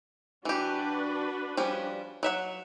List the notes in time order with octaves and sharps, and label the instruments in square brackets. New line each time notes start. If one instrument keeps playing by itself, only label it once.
[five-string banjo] E3 G4 [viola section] D4 F#4 B4
[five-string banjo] F3 G3 C#4
F#3 E5 F#5